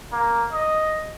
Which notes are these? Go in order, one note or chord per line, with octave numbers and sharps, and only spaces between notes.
A#3
D#5